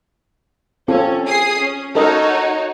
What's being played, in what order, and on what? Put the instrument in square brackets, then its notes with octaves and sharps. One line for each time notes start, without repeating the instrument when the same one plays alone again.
[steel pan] C4 F4 A4 [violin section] C#4
[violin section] G#4 D#6 C7
C#4
[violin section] D#4 F#4 C#5 [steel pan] A4 A#4 D#5